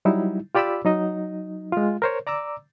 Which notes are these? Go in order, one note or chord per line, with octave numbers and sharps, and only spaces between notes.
F#3 G3 D#4 E4
F4 G4 D5 B5 D6 E6
F#3 D#4 D#5
G#3 F4
A#4 C5 C#5
D5 A#5 D6 E6